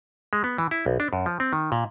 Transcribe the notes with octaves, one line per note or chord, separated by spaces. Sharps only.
G#3
B3
E3
E4
B1
D4
F#2
F3
C4
D#3
A#2